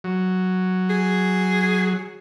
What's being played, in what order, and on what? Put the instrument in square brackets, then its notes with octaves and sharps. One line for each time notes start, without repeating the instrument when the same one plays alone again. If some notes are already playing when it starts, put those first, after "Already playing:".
[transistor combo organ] F#3
[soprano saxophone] G#4